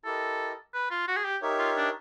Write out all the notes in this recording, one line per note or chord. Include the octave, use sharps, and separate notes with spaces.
E4 G4 A4 A#4 D#5
B4
F4
F#4
G#4
G4
D#4 G4 A#4 C#5 E5
F4
D4